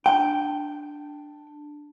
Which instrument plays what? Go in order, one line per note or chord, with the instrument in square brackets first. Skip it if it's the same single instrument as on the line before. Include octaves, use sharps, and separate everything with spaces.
[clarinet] D4 [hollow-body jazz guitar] G5